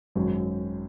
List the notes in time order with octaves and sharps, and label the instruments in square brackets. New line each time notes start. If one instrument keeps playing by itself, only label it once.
[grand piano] G#1 F#2 F#3